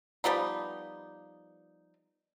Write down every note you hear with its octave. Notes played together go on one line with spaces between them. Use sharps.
F3 G3 B3 D#4